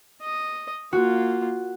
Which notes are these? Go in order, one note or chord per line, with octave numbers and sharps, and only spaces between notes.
D#5
A#3 F4 F#4